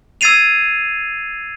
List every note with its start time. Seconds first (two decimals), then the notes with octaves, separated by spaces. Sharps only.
0.21 E6 G#6 A6 C7 D#7 F7